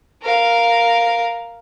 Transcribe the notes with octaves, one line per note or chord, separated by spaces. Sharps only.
A#4 F5